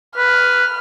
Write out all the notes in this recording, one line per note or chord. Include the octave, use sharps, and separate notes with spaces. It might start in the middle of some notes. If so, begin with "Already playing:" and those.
B4 F6